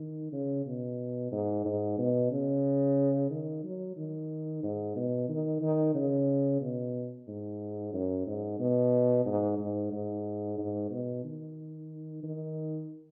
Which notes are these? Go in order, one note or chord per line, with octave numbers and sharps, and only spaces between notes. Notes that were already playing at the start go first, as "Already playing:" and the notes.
Already playing: D#3
C#3
B2
G#2
G#2
B2
C#3
D#3
F#3
D#3
G#2
B2
D#3
D#3
C#3
B2
G#2
F#2
G#2
B2
G#2
G#2
G#2
G#2
B2
D#3
D#3